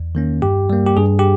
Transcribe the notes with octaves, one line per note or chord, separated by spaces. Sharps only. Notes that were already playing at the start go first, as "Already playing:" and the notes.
Already playing: E2
D#3 A#3 C#4
G2 G4
G3 A#3
G4
G2 G#4
G4